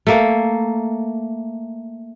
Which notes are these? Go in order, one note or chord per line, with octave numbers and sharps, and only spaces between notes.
A3 A#3